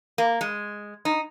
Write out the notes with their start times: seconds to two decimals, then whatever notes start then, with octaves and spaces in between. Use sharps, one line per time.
0.18 A#3
0.41 G#3
1.05 D#4